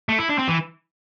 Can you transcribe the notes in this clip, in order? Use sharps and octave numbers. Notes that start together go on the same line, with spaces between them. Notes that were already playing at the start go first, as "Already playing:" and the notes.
A3
E4
D4
C4
E3